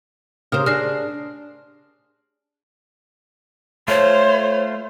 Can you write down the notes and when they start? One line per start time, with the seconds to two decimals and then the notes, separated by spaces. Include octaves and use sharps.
0.52 C#3 G4 A#4 C5 D#6 F6
0.66 D4 G#4 F6 A#6 C7
3.88 A3 F4 C5 C#5